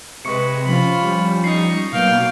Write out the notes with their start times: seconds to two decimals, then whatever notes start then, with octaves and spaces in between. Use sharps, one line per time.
0.25 C3 G#3 B4 C#6 C#7
0.66 F3 C#4 F4 B5
1.01 G3
1.44 D#4 C#6 C7
1.92 B2 F#3 A#3 B3 F5 G5